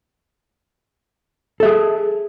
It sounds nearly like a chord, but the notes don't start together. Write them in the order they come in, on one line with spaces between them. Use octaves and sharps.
A4 E5 G#4